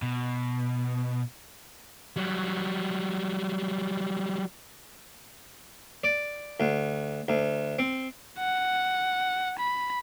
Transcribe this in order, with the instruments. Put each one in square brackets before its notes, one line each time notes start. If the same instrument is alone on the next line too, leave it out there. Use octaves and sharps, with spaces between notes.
[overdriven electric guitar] B2
[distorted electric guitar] F#3 G3
[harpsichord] D5
D2
D2
C4
[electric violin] F#5
B5